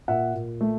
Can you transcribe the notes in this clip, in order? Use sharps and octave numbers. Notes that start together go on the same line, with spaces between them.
A#2 E5 F#5
A#2
A3